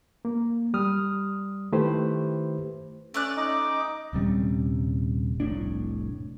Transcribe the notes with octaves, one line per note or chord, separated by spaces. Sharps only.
A#3
G3 D#6 F6
D#3 A3 E4 G4 B4 C5
A3 C#4 D5 F#6
D#4 D#5 D6
D#1 C3 G3 C#4
F1 C2 A2 D4